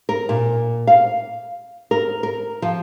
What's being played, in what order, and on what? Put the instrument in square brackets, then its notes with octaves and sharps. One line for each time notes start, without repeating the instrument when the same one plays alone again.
[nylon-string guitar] A#4
A#2
F5
A#4
A#4
F3